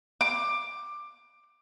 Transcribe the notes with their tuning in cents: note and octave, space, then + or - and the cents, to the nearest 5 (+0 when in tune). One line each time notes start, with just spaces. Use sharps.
D6 +15